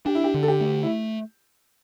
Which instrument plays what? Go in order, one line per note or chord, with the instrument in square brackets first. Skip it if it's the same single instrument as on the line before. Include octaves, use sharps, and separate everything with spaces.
[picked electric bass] D4 [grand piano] G4
[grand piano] E4
G4
[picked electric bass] D3
[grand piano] A4
G4
[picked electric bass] A3
[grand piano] E4